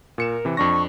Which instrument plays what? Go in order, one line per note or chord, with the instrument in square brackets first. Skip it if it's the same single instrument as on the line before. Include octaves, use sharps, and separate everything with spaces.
[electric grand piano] A#2 C#7 E7 [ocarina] A#4
[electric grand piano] C3 E3
[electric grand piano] F2 D4 A#6 [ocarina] C#6